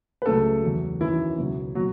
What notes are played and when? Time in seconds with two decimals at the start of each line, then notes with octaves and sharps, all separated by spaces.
0.22 B4
0.26 C#2 C#3 F#3 A3 A4
0.63 E2 C#3 F#3
1.00 F#2 D#3 E3 F#3 E4
1.38 C#2 B2 F#3
1.75 B2 F#3 F#4